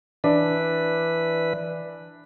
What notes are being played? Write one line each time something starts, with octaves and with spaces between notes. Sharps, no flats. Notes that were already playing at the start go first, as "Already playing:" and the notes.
E3 D4 B4